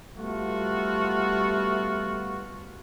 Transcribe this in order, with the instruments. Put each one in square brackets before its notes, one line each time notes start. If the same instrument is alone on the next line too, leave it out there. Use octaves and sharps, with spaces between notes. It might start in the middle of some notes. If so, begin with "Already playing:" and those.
[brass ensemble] G3 A3 B3 F4 F#4